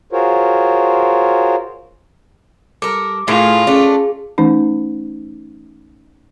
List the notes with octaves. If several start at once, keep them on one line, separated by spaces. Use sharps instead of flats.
F4 F#4 G#4 A#4 C5 C#5
G3 A4 A#4 D6
A2 A3 F4 G#4 A#4
A3 C#4 D4 G#4
E3 A3 C#4 D#4